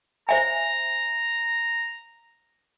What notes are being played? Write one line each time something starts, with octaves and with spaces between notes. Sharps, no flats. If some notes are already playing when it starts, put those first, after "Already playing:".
C5 E5 G#5 A#5